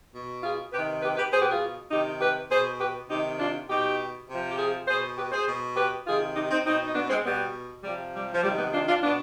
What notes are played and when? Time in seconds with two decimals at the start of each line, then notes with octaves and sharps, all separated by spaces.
0.14 B2
0.43 F4 G#4
0.73 C3 D#3 G4 B4
1.02 G4 B4
1.17 G4 B4
1.32 B2 G#4 C5
1.42 G4 B4
1.51 F4 G#4
1.91 C3 D#3 D#4 G4
2.21 G4 B4
2.50 B2 G#4 C5
2.80 G4 B4
3.09 C3 D#3 D#4 G4
3.39 D4 F4
3.68 B2 D#4 G4
4.28 C3 F3
4.50 G4
4.58 F4 G#4
4.88 B2 G#4 C5
5.17 G4 B4
5.32 G#4 C5
5.47 B2
5.76 G4 B4
6.06 C3 D#3 F4 G#4
6.36 D#4 G4
6.51 C4 D#4
6.65 B2 C4 D#4
6.86 D#4
6.95 B3 D4
7.10 G#3 C4
7.25 B2 G3 B3
7.84 C3 F3 G3
8.14 G3
8.33 F3
8.43 C3 G3
8.48 D#3
8.58 G3 B3
8.72 D4 F4
8.88 D4 F4
9.03 B2 B3 D4